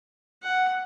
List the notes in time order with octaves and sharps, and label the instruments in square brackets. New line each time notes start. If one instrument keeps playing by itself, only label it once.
[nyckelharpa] F#5